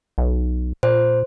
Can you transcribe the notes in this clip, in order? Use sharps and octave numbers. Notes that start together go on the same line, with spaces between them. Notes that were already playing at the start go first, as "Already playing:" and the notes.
B1
A#2 C5